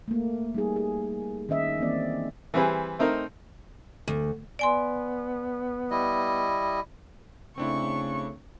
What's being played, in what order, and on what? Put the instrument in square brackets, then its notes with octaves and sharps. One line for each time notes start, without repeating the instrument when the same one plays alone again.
[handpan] A3 A#3
G3 D#4 G#4
G#4
D#3 C#4 D#5 E5
E3 A#3 C4 D5
[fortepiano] E3 G3 C4 G#4 B4
A3 C4 D#4 A#4
[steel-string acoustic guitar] D2
[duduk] B3 [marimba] D5 G#5 C6
[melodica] G3 E4 D#5
[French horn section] C#3 A3 [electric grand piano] C4 D4 E4 [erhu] C#6